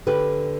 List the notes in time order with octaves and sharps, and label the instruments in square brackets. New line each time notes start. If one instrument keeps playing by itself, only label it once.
[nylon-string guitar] D3 G4 B4